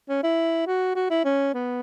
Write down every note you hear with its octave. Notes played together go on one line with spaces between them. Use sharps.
C#4
E4
F#4
F#4
E4
C#4
B3